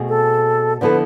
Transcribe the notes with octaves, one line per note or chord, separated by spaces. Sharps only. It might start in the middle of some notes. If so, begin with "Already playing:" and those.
Already playing: B2 A3 C4 G#4
A4
D3 F3 B3 E4 A4 B4